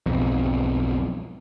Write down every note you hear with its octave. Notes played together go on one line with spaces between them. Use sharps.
B1 F2 G#2